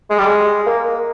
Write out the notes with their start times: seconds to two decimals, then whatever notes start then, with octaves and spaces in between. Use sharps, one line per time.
0.10 G#3
0.18 G3
0.26 G#3
0.66 A#3
0.85 A#3